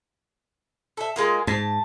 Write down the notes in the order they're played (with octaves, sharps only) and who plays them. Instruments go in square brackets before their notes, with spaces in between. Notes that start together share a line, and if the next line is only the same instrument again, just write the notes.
[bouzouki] A4 E5
G#3 A#3 F4
[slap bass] G#2 [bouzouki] A5